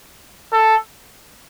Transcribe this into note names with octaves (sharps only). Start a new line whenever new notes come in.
A4